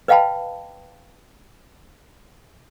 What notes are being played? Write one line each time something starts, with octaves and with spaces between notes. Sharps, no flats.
B4 D#5 F5 G5 A5 B5